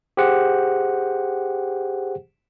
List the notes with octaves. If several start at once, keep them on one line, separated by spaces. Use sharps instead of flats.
G4 G#4 C5 F#5 G5